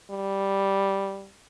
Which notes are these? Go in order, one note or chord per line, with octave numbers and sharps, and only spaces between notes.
G3